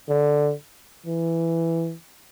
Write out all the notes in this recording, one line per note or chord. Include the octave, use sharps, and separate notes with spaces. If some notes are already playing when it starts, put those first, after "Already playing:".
D3
E3